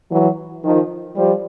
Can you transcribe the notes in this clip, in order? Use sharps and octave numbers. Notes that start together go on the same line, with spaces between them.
E3 F#3
D#3 F3
F3 G3